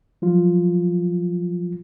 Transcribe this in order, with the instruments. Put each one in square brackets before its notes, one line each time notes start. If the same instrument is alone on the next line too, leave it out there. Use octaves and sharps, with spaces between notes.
[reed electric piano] F3 F#3 F4